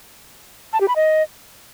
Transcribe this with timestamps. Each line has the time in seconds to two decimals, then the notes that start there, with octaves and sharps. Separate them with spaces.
0.73 A5
0.81 G4
0.88 B5
0.96 D#5